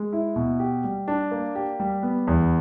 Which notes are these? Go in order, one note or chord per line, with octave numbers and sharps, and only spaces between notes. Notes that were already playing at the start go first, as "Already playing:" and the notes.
Already playing: G#3
E4
B2
G4
G3
D4
A#3
G4
G3
B3
E2